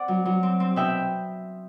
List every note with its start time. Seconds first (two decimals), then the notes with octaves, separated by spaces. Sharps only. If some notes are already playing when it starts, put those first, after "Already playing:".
Already playing: C4 D5 F#5
0.08 F#3
0.25 F#3
0.43 C4
0.60 C4
0.76 B2 E5 G5